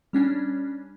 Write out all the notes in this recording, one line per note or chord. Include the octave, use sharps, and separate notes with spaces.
G3 C#4 D4